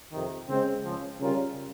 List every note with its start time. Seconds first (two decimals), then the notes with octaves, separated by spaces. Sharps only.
0.12 F2 C3 D#3
0.48 C#3 G#3 C4
0.84 C#2 C#3 F3
1.20 C#3 G3 C#4 F4 A#4